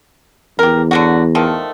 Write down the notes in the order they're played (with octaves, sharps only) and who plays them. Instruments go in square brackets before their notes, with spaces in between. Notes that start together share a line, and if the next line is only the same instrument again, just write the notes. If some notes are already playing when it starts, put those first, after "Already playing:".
[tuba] E2 [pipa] G4 A#4
[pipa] D3 F#3 F#4
D#3 F3 A3